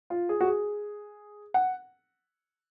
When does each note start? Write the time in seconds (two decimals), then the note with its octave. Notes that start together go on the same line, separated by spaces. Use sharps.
0.10 F4
0.29 G#4
0.41 F#4
0.47 G#4
1.54 F#5